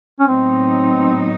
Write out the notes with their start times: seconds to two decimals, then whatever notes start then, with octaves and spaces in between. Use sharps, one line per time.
0.20 C#4
0.28 A2 F#3 B3 C4 D#4